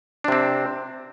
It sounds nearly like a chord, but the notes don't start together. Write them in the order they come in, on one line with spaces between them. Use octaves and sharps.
D4 C3 C4